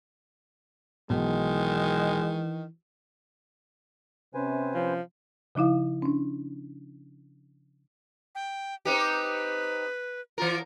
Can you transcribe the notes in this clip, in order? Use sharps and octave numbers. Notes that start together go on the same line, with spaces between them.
B1 D#3 E3 G#3
C3 C#4 B4 C5 G#5
F3
C#3 F3 D#4 E4 F5
C#4 D4
G5
C4 D#4 G4 B4
E3 F4 A#4